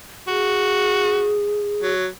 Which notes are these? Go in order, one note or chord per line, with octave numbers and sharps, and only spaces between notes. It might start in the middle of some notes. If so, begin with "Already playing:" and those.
F#4 G#4
F#3